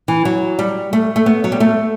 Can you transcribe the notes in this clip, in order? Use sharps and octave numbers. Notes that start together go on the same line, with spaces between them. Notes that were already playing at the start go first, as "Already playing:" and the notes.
E3
F#3
G3
A3
A3
B3
F#3
G3
A3